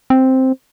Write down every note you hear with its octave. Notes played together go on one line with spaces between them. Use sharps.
C4